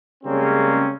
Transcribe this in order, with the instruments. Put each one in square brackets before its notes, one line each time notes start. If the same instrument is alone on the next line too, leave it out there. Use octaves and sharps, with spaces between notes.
[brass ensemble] C#3 G3 G#3 A#3 C4 C#4